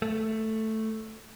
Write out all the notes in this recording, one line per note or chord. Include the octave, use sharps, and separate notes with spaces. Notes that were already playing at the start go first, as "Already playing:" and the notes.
A3